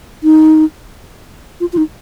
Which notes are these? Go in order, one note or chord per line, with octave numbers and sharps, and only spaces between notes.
D#4
F4
F4
D#4